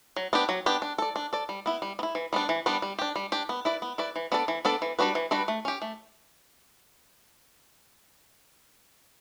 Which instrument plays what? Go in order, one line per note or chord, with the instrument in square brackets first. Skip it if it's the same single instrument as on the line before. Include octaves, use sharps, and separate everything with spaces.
[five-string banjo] F#3
B3 D4 G4
F#3
B3 D4 G4
D4
A4 D5
D4
A4 D5
G3
B3 E4
G3
B3
E4
E3
G3 B3 D4
E3
G3 B3 D4
G3
D4 G4
G3
D4 G4
B3
E4 B4 D5
B3
E4 B4 D5
E3
B3 D4 A4 D5
E3
B3 D4 A4 D5
E3
G3 D4 F#4 B4
E3
G3 D4 F#4 B4
A3
C#4 G4
A3